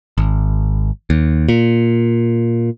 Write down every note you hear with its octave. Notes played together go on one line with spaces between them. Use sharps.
G#1
D#2
A#2